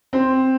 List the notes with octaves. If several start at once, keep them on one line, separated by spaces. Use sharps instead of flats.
C4